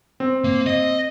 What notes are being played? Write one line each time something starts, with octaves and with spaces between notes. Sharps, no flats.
C4
A#3
D#5